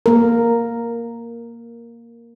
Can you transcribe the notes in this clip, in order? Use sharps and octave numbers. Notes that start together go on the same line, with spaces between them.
A#3 A#4